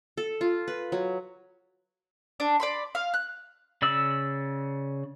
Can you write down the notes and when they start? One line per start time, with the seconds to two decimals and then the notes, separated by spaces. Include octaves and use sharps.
0.17 A4
0.41 F4
0.68 B4
0.92 F#3
2.40 D4
2.60 D5 B5 C6
2.95 F5
3.14 F#6
3.82 C#3 D5 E6